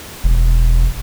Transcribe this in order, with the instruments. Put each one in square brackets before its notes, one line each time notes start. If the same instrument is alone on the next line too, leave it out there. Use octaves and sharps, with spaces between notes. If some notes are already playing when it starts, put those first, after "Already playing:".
[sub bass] E1